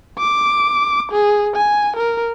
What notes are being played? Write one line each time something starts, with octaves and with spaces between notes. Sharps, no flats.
D6
G#4
G#5
A#4